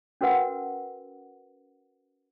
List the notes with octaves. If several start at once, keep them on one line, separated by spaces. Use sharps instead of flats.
C#4 F#4 A#4 B4 F#5